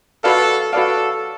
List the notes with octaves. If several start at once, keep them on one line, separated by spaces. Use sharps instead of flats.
F#4 A4 B4 D5 F5
F#4 A4 B4 D5 F5